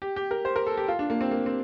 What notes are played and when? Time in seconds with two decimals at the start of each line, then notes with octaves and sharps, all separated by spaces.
0.02 G4
0.16 G4
0.31 A#4
0.45 C5
0.56 A#4
0.67 A4
0.77 G4
0.88 F4
0.99 D4
1.10 A#3
1.21 C4
1.31 A#3
1.46 C4